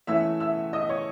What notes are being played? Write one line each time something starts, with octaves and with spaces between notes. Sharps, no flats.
E3 A3 C#4 E5 E6
E5 E6
D#5 D#6
C#5 C#6